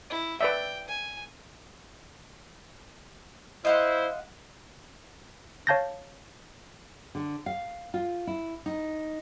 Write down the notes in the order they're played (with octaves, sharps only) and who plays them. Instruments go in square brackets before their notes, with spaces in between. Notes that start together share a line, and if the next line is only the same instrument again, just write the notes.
[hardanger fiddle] E4
[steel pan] B4 D5 E5 [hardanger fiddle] G5
[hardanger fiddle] G#5
[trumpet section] E4 C5 [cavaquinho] D#5 F5 F#5
[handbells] C#5 F5 A5 G6 A6 A#6
[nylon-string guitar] D3
F5
F4
E4
D#4